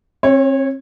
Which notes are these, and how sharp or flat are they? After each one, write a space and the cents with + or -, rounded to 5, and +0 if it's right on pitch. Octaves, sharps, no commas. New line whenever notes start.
C4 +40 C#5 -15